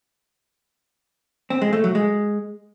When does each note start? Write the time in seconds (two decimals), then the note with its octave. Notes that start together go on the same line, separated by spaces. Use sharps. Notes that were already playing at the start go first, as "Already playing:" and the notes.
1.50 C4
1.62 G#3
1.73 A3
1.84 F#3
1.95 G#3